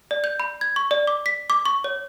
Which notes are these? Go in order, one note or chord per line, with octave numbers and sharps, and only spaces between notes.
D5
G6
B5
G#6
C#6
D5
D6
B6
D6
C#6
C#5